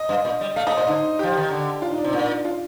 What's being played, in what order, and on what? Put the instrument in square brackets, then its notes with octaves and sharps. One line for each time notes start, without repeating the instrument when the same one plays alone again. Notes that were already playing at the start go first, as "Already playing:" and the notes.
Already playing: [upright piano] D#5
[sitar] G2
A#2
G3
[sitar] A3 [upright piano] F5
[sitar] A3 [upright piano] D#5
[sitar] A#2 [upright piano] C5
[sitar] D3 [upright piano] D#4
[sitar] F3 [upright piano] G4
[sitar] D#3
D3
[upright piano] F4
D#4
D4
[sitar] C3
A#2
[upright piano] F4